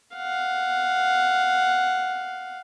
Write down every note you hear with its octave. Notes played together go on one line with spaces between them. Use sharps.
F5 F#5